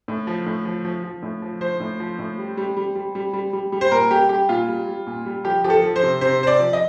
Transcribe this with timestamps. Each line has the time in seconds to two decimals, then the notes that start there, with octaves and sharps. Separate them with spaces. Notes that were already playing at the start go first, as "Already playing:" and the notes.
0.08 A2
0.27 F3
0.46 A2
0.65 F3
0.85 F3
1.04 F3
1.22 A2
1.42 F3
1.61 F3 C5
1.80 A2
2.00 F3
2.19 A2
2.38 G3
2.57 G3
2.77 G3
2.95 G3
3.15 G3
3.33 G3
3.53 G3
3.72 G3
3.81 C5
3.91 A#2 A#4
4.11 G3 G4
4.29 G3 G4
4.49 A#2 F4
4.68 G3
4.87 G3
5.07 A#2
5.26 G3
5.45 F3 G4
5.64 F3 G4
5.70 A4
5.83 F3
5.96 C5
6.03 C3
6.21 C3 C5
6.40 C3 C5
6.47 D5
6.60 F3
6.73 D#5